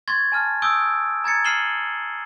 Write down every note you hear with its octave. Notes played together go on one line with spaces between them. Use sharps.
C6 C#6 G#6 A6
G#5 A5 F6
G#5 C#6 D#6 E6 G6 D7
A#5 G#6 A6 C#7
F6 C7 D#7 E7 F#7 G7